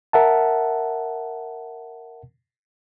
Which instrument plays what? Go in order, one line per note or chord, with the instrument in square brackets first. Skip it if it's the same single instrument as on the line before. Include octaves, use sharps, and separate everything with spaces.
[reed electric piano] A#4 E5 F#5 A5